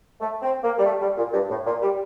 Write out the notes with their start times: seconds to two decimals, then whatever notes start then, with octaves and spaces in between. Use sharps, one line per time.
0.21 A3
0.42 C4
0.63 A#3
0.78 G3
0.85 A3
1.01 G3
1.17 A#2
1.33 G2
1.50 A2
1.66 A#2
1.82 G3